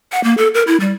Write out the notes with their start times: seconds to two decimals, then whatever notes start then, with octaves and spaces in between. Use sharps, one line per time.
0.12 F#5
0.24 A#3
0.38 A4
0.54 A#4
0.67 E4
0.80 G3